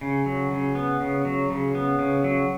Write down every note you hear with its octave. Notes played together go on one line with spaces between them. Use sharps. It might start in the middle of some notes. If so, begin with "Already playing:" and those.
C#3
F#3
C#3
B3
C#3
F#3
C#3
B3
C#3
F#3